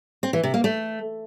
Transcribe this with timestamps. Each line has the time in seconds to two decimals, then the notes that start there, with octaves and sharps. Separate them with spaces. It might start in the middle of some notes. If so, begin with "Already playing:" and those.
0.23 C4
0.33 E3
0.43 C3
0.54 A#3
0.64 A3